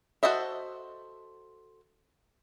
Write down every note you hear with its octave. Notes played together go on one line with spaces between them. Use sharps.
F#4 A4 C5 D#5 E5